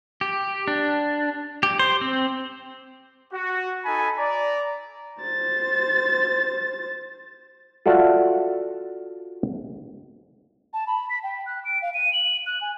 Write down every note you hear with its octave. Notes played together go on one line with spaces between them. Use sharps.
G4
D4
G4
C5
C4
F#4
D#4 A4 G#5 B5
D5 A#5
C5 A6
F4 F#4 A4 D5 E5 F#5
A5
B5
B6
G5
F#6
D7
F5
D#7
F#7
F#6
G#5